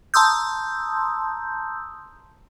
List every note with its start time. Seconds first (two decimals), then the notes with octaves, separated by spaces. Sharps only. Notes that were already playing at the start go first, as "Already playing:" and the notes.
0.14 A5 A#5 C6 D#6 E6 G6